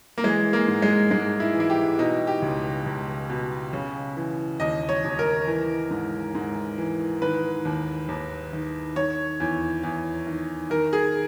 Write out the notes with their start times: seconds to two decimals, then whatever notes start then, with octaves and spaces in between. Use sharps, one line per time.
0.18 A#3
0.24 E3 G#3
0.53 A#3
0.68 G#2
0.82 G#3
1.11 G#2 G#3
1.40 E4
1.54 E3
1.60 E4
1.70 G4
1.98 B2 D#4
2.27 G4
2.42 C#2
2.86 C#2
3.29 B2
3.73 C#3
4.17 E3
4.60 D#2 D#5
4.89 C#5
5.04 D#2
5.19 A#4
5.47 E3
5.91 G#2
6.35 G#2
6.78 E3
7.22 D#3 B4
7.65 D#2
8.09 D#2
8.53 D#3
8.96 D#3 C#5
9.40 E2
9.83 E2
10.27 D#3
10.70 D#3 A#4
10.93 G#4